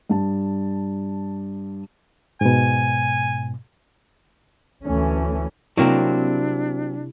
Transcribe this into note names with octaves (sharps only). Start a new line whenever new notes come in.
G2 A5
G#2 B2 G#5
D2 E3 A3 C#4
C3 F#3 A#3 C4 D4 E4